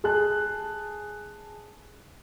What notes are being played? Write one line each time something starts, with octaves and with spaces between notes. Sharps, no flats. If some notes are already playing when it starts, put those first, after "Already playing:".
G#4 A5 F#6